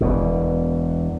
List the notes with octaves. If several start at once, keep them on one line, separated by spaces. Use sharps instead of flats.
E1 E2 B2